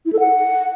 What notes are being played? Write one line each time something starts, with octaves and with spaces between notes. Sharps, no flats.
E4
A4
F#5